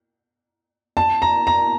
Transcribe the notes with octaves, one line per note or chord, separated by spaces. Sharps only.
A5
A#5
A#5